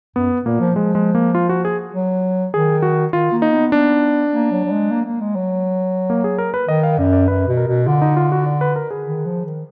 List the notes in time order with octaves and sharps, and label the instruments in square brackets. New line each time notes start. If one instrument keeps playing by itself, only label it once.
[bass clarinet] F#2 [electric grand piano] B3
[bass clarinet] A#2 [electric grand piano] A#3
[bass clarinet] F3
[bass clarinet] F3 [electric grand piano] G#3
[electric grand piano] G#3
A#3
F4
F#4
G#4
[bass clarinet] F#3
[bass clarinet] D#3 [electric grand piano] G#4
[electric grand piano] F#4
[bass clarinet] D#3 [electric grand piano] F4
[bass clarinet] A#3
[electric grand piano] D#4
[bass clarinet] B3
[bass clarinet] B3 [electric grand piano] D4
[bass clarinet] A#3
F#3
F#3
G#3
A#3
A#3
G#3
F#3
[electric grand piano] A#3
G#4
A#4
B4
[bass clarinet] D#3 [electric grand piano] D#5
[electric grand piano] F5
[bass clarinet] F#2 [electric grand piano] D5
[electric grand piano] D5
[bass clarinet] F#2 [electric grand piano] B4
[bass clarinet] B2
[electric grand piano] A#4
[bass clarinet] B2
[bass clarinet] D3 [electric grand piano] F4
[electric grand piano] D#4
F4
F#4
D5
B4
A#4
G#4
[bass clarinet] D#3
F3
D#3